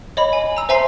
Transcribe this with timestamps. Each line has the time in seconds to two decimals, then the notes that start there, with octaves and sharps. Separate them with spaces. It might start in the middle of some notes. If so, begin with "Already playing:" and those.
0.17 C#5 D#5 B5
0.33 G#5
0.57 A#5 E6
0.69 C5 E5 G#5 A#5 C6 C7